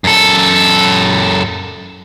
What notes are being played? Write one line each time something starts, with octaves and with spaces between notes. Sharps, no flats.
F#2 A4